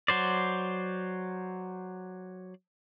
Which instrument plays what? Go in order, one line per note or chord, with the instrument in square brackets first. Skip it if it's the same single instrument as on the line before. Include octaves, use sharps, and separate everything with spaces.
[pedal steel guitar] F#3 C5 D5